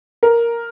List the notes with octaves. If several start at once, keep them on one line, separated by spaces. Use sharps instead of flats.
A#4